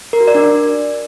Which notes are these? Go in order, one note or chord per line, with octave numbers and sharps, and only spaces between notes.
A#4
F#4
D5
D4